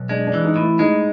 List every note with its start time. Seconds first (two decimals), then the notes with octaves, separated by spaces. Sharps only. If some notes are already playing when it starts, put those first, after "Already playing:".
Already playing: B1
0.09 G#3 D4
0.27 D4
0.34 E3
0.45 D#4
0.56 A2
0.62 E4
0.79 G#3 D#4